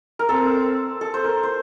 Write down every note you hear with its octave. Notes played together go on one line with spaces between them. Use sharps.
A#4
C4 A4
A4
C5
A#4
C5